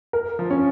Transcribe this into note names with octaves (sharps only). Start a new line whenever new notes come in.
A#4
F3
C#4